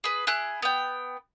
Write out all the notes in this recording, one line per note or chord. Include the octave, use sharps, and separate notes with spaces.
G#4 B4
E4 G#4 F#6
B3 G5